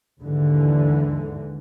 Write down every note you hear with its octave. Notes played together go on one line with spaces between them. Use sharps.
D#2 G#2 D3 E3